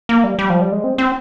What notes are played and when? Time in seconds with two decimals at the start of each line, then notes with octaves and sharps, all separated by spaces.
0.09 A#3
0.24 G3
0.39 G3
0.50 F3
0.61 G3
0.72 G#3
0.84 C4
0.98 C4